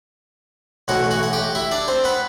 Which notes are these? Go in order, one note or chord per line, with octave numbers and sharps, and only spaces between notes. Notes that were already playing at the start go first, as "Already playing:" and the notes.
B1 A2 E3 F#4 F#5
F#4 F#5
F#5
G4 G5
E4 E5
D4 D5
C4 C5
B3 B4